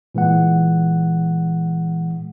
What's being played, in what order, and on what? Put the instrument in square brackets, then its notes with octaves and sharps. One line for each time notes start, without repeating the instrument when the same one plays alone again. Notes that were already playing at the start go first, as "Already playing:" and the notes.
[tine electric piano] A#2 E3 G#3 F#5